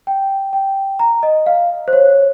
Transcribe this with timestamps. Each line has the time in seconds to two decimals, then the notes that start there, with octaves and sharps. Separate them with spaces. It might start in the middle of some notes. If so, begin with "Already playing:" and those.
0.07 G5
0.53 G5
0.99 A#5
1.23 D#5
1.46 F5
1.88 C5
1.93 C#5